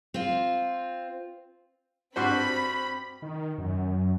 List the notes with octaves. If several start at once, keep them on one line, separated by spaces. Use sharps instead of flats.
C4 F4
G2 C4 F#4 C5 B5
D#3
F#2